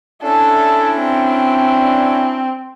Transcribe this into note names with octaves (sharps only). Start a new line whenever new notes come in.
C#4 D4 E4 A4
C4